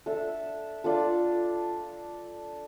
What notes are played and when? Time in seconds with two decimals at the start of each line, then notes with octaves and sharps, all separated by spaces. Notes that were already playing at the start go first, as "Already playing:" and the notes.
0.06 D4 A4 E5
0.84 D4 F4 A4